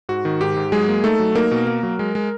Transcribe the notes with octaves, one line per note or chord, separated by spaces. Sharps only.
G#2 F#4
D#3
G#2 G4
G#2
F#3 G#3 G#4
A#3
A3 D#4 A4
F#3
A#3 D#4 A#4
B2
A#3
F#3
G#3
G#3